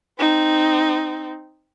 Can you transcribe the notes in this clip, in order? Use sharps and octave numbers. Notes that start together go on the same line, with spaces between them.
C4 D#4